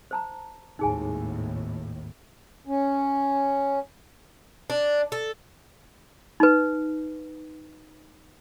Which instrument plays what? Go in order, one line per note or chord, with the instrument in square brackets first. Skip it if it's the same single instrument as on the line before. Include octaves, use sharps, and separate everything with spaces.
[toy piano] C5 A5 A#5
[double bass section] G#1 D#2 A2 [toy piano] D#4 G#4 G#5
[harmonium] C#4
[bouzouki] D4
A4
[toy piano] D#4 B4